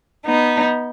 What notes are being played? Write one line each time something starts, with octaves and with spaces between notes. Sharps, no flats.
B3 D#4